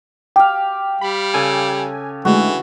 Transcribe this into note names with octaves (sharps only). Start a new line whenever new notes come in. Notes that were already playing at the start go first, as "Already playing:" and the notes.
G4 F5 G5
G3 B5
C#3 A4 G#5
D3 E3 G#3 A3 F#4